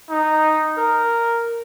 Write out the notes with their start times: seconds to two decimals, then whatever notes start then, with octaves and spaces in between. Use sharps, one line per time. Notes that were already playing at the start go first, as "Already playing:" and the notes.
0.10 D#4
0.77 A#4